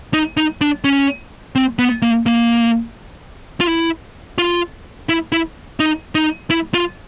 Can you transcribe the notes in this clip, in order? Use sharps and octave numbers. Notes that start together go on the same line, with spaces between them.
D#4
D#4
D4
C#4
C4
B3
A#3
A#3
F4
E4
F4
E4
E4
D#4
D#4
E4
F4